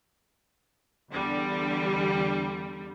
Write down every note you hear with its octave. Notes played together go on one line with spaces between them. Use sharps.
E2 D3 G3